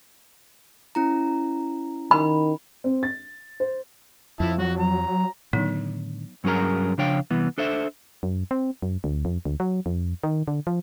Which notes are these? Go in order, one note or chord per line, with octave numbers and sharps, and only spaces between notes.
C#4 E4 A#5
D#3 B5
C4
A6
C5
F2 F3 E4 A5
F#3 F#4
A#5
A2 D3 D#3 F#3 B3 D#4
G2 F#3 C#4 G#4 A#4 A#5
C#3 F3 D4 C#5 F5 G5
C2 E3 B3
D4 A4 C5 E5
F#2
C4
F#2
D2
F2
D2
F#3
F2
D#3
D3
F3